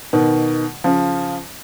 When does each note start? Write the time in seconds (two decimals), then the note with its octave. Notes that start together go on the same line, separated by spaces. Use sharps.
0.13 B2 D#3
0.84 C#3 F3